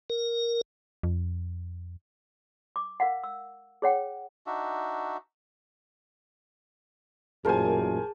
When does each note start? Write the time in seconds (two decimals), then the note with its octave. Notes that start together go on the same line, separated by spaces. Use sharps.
0.10 A#4
1.03 F2
2.76 D6
3.00 A#4 F5 F#5
3.24 E6
3.82 G#4 C#5 F#5 G5
4.47 D4 D#4 F#4 E5
7.45 A1 F#2 A#2 G#4 A#4 C5 G#5 A5